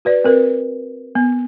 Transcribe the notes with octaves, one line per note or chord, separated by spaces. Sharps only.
F#4 B4 D5
C4 A#4 B4
B3